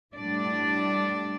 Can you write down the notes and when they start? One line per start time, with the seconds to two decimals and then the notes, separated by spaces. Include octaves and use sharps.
0.17 A2 G3 D4 D5